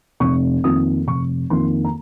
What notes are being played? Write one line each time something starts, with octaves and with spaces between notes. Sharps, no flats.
F1 C#6
F2 D#3 A#3 D#6
F1 C#6
F2 D#3 A#3 C6
A#5